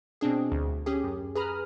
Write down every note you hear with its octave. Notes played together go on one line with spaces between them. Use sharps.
B2 C4 D4 G#4
D2
C#4 G4 G#4
F#2
G#4 B4 A#5 B5 D#6 F6